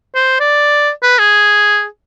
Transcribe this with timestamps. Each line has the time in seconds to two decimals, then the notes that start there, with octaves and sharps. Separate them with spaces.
0.15 C5
0.40 D5
1.03 B4
1.19 G#4